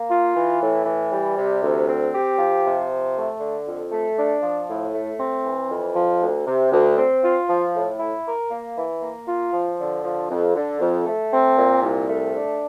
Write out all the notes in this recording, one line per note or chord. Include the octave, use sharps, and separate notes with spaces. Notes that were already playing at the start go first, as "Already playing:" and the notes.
Already playing: A#3
F4
E3
A2
E3
G3
C3
D2
C4
G4
F3
C3
F3
A3
D3
F2
A3
D4
F3
A2
A3
C4
E3
F2
F3
D2
C3
D2
C4
F4
F3
A2
E4
A#4
A#3
E3
A#3
F4
F3
D3
F3
F2
D3
F2
A3
C4
A#2
C2
A3
D4